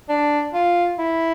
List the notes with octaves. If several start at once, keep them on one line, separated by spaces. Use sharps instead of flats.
D4
F4
E4